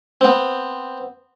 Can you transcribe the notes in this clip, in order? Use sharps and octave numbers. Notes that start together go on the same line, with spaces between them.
B3 C4